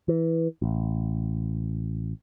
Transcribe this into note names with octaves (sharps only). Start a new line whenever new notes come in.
E3
A1